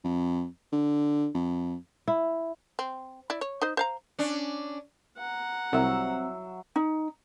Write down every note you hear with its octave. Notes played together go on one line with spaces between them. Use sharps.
F2
D3
F2
E4
C4
E4 D5
C#5
D#4 C5 D#5
C5 F5 A#5
C#4 D4
F#5 A#5
C2 F#3 C4 E5
D#4